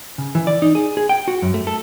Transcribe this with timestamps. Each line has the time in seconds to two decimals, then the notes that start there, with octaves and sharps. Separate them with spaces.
0.18 C#3
0.35 E3
0.47 D5
0.62 D#4
0.75 G#4
0.97 G#4
1.09 G5
1.28 F#4
1.42 F#2
1.54 A3
1.67 A4